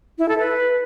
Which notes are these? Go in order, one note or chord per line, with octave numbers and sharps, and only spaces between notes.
E4
A4
B4